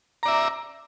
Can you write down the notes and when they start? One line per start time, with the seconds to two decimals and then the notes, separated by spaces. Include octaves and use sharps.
0.23 A#5
0.25 D5
0.28 E5